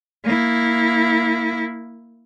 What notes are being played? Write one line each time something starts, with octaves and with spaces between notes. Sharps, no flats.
A#3 E4